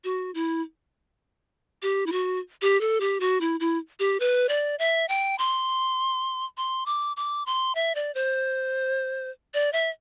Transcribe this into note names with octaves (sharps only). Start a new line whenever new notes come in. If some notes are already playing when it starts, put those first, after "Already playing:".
F#4
E4
G4
E4
F#4
G4
A4
G4
F#4
E4
E4
G4
B4
D5
E5
G5
C6
C6
D6
D6
C6
E5
D5
C5
D5
E5